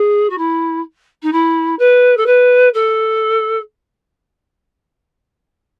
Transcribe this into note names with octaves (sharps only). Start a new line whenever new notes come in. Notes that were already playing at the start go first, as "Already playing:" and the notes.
Already playing: G#4
F#4
E4
D#4
E4
B4
A4
B4
A4